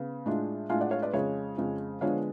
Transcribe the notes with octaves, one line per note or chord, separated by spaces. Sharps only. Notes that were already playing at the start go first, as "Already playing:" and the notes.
Already playing: C#3 B3
A2 G#3 D4 F4
A2 G#3 D4 F4 F5 G#5
D5 F#5
C#5 F5
B4 D5
F2 C#3 G#3 C#5
F2 C#3 G#3
D3 F3 G#3 B3 D4 C#5 F5